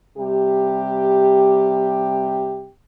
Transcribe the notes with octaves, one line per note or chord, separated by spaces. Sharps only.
C3 G3 G4